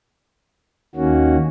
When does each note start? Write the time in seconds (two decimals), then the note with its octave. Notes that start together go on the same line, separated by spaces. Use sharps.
0.95 D#2 D#3 A#3 C#4 F#4